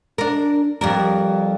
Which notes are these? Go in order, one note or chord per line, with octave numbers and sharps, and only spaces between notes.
D4 A#4
F2 G3 A#4